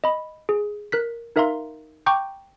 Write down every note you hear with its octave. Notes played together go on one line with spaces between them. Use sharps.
D#5 B5
G#4
A#4 F#6 B6
D#4 A#4 E5 F5 A#5 C6
G5 A#5 C#6 D6 G6